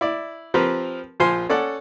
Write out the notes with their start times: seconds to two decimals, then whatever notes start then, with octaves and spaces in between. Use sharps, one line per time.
0.01 E4 D5
0.54 F3 C4 G4 A#4 B4
1.20 A#1 F3 F4 C5 G#5 C6
1.49 C#4 A4 D5 F#5